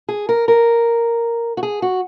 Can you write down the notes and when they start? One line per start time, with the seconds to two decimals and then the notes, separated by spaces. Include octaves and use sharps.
0.09 G#4
0.29 A#4
0.48 A#4
1.57 F#4
1.63 G#4
1.82 F#4